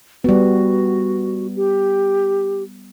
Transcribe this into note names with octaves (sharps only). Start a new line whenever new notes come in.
G3 B3 F#4
G4